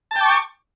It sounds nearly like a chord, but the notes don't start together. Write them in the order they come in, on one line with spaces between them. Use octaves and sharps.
A5 G5 D6 C#6